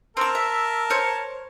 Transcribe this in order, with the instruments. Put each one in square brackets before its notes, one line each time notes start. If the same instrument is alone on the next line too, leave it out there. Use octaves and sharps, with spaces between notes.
[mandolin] C4 E6 [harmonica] A#4 A5
[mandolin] E5
C5 C#5 F6